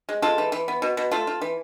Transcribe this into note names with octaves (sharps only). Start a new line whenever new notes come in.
G#3
G#3 F4 A4
E3
E3
B3
B2
B2
A3 F4 A4
F4
E3